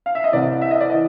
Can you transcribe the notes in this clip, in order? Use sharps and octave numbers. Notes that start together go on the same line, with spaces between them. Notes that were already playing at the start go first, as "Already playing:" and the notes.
F5
E5
D#5
C2 C3 E3 D5
E5
D#5
D5
E3 D#5